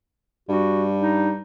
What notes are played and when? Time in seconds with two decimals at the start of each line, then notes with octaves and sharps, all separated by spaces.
0.49 G2 F#4
1.00 D#4